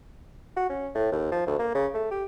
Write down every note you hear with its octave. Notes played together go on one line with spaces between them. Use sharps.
F#4
C#4
A2
D#2
F3
D2
A#3
C#3
A3
G4